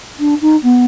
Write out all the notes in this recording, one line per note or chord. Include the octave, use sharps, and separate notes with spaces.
D4
D#4
B3